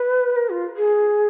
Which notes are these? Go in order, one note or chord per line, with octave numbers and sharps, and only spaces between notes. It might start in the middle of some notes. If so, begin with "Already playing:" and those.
Already playing: B4
A#4
F4
G#4